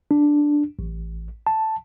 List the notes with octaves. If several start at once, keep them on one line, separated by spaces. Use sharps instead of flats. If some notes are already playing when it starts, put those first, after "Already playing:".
D4
A1
A5